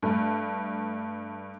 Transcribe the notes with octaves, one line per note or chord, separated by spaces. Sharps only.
G2 A3